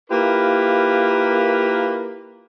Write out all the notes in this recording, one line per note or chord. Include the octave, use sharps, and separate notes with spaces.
A#3 E4 F4 G4 A#4 B4